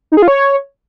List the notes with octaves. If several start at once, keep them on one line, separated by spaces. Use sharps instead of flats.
D#4
G#4
F4
C#5